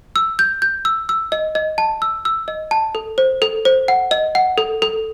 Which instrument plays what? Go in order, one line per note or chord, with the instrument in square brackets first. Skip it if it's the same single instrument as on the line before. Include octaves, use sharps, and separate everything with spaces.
[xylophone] E6
G6
G6
E6
E6
D#5
D#5
A5
E6
E6
D#5
A5
A4
C5
A4
C5
F#5
D#5
F#5
A4
A4